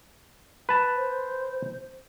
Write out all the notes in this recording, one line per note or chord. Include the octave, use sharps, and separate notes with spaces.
B4 A5
C5